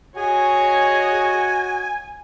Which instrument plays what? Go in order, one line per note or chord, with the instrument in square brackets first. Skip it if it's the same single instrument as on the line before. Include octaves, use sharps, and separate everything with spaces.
[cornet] F#4 [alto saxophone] G#4 [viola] C#5 D#5 [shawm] G#5